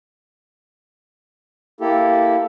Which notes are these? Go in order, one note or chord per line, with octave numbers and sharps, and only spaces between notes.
A#3 E4 G4 A4